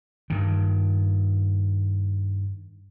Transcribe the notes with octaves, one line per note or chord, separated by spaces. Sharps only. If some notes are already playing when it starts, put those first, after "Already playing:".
G2 D#3